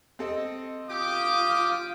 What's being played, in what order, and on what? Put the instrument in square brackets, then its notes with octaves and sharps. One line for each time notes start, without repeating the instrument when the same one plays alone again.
[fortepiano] C4 A4 D#5
[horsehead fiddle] F4 [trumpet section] G4 D6 [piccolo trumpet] D#6